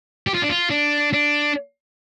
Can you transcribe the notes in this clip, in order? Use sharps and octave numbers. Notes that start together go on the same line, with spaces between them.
G4
F4
D4
F4
D4
D4